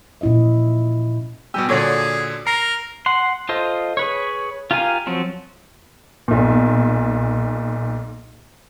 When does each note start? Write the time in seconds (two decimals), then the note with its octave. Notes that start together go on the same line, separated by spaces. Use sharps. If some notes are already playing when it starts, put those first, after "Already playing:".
0.21 A#2 C#4 E4 D#5 E5
1.54 B2 G3 G4 G#5 E6
1.69 A#2 D3 F#4 G#4 C#5 D5
2.47 A#4 A#5 A#6 C7
3.06 F#5 C6
3.49 F4 A4 C5 D#5
3.97 G#4 B4 C#5
4.71 F4 G4 A#4 F5 G#5
5.07 F3 F#3 C4
6.28 B1 A#2